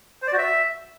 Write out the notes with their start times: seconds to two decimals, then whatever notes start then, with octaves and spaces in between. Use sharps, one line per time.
0.22 C5
0.27 D5
0.33 F#4
0.38 E5